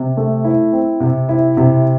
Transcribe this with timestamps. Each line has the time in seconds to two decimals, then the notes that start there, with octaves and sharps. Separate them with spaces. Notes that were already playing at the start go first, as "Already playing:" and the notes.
Already playing: C3
0.17 A3
0.44 E4
0.72 C4
1.00 C3
1.29 E4
1.57 C3